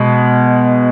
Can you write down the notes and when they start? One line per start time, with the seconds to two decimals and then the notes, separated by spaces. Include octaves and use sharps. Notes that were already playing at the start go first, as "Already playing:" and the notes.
Already playing: B2 G#3